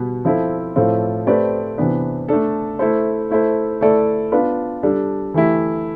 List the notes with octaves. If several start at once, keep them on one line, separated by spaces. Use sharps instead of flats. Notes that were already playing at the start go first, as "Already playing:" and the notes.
Already playing: B2 G3 B3
F3 C4 E4 A4
A2 F3 C4 F4 A4
A3 C4 G4 B4 D5
C3 E3 B3 D4
A3 D4 A4
A3 E4 A4 C5
A3 E4 A4 C5
A3 E4 A4 D5
B3 D4 F4 B4
G3 D4 A4
E3 A3 E4 G4